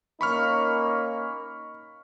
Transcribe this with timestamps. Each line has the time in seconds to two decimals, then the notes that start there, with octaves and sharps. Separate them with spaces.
0.21 A#3 C#4 D#4 B5 C#6 F6